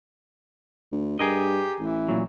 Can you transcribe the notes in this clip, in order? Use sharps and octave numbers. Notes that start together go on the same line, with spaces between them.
D2
G2 G4 G#4 A#4 D#5
A1 E3
A#2 F#3